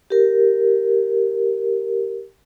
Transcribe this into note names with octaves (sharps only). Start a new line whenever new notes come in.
G4 A#4